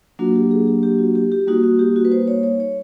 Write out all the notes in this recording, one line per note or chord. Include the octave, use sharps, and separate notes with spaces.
F#3 A#3 D4 F4 F#4
G4
G#4
G4
G4
F#4
G4
G4
G3 A#3 D#4 F#4
F#4
G4
F#4
B4
C5
C#5
C#5
C#5